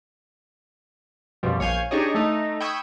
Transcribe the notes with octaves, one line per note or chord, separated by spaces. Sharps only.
F#2 B2 F3 G3
A#1 C#5 F5 G#5 G6
D4 D#4 G4 G#4 C#5 D#5
A3 D#4
G5 B5 C#6 D#6 E6 G#6